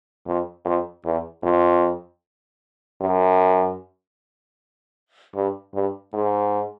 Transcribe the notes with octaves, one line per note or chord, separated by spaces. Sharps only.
F2
F2
E2
F2
F#2
G2
G2
G#2